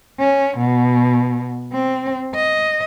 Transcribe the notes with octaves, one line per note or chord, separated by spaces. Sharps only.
C#4
B2
C4
D#5